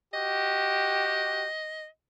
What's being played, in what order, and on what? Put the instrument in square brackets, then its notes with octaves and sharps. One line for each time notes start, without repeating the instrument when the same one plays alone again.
[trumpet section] F#4 G4 [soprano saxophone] D#5